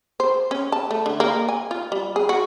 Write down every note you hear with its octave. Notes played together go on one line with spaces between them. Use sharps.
C5
C#4
A5
A3
D3
A#3
G#5
F4
G3
G#4
F#4